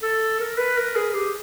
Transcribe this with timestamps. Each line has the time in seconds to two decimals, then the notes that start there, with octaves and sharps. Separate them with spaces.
0.02 A4
0.40 A#4
0.58 B4
0.77 A#4
0.96 G#4
1.14 G4